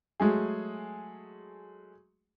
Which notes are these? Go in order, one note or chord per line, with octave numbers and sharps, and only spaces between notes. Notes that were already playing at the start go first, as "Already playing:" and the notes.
F#3 G#3 A3 G#4